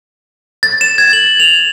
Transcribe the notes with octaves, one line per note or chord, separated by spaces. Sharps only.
A6
E7
G#6
F#7
F7